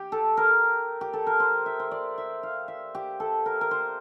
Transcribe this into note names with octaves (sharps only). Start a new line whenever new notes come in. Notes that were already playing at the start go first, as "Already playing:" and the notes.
Already playing: G4
A4
A#4
G4
A4
A#4
C5
E5
C5
D5
E5
F5
E5
G4
A4
A#4
A#4
C5